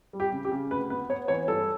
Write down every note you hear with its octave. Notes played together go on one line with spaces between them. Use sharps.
G3
G4
C#3
G4
C#3
D2 B4
B3 B4
B3 C#5
E3 C#5
G2 A4